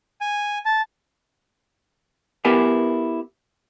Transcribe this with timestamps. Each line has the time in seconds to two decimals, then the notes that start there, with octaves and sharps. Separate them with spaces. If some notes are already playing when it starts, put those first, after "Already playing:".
0.21 G#5
0.65 A5
2.45 B3 E4 G4 A#4 B4 G#5